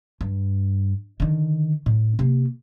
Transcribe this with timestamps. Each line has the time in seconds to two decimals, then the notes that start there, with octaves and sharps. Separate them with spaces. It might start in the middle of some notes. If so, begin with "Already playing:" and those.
0.21 G2
1.20 D3 D#3
1.86 A2
2.19 C3 A#3